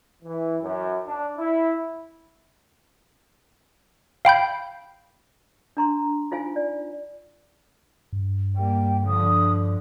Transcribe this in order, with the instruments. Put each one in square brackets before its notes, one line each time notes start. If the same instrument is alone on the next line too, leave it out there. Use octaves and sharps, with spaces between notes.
[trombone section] E3
F#2
D4
E4
[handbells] F5 G5 B5 G6
[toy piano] D4 A#5 C6
D#4 F4 C5 F5 G#5
D5
[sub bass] G2
[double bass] G3 A#3 [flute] G5
[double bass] D3 F3 [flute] D#6